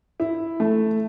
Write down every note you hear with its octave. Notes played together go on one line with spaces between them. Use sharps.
E4
A3